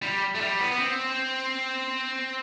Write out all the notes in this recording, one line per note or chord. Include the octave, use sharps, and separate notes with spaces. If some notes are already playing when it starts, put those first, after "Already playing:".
G3
A3
G3
B3
B3
C4